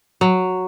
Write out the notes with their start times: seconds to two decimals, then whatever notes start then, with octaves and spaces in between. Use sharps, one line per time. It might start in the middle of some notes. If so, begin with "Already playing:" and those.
0.21 F#3